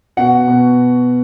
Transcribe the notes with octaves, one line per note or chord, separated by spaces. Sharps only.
B2 F#4 F#5
B2